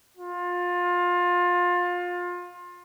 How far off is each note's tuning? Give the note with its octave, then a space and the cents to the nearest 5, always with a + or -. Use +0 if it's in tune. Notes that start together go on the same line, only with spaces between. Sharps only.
F4 +25